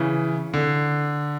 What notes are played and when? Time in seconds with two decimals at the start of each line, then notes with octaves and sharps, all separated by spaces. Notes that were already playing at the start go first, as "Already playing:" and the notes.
Already playing: C#3 E3
0.54 D3